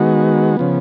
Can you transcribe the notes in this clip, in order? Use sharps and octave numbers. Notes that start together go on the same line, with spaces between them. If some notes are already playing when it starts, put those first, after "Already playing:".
Already playing: D#3 G#3 B3 F#4
C#3 F3 B3